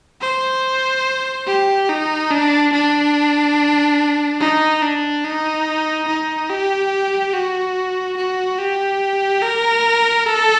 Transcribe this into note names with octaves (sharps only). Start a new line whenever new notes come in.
C5
G4
D#4
D4
D4
D#4
D4
D#4
D#4
G4
F#4
F#4
G4
A#4
A4